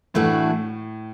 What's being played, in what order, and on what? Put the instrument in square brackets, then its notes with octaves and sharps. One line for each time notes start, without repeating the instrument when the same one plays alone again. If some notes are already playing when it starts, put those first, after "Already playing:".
[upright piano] A2 [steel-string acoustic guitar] E3 A3 D4 F#4